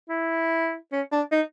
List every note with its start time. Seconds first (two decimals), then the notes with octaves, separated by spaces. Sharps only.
0.10 E4
0.92 C#4
1.12 D4
1.32 D#4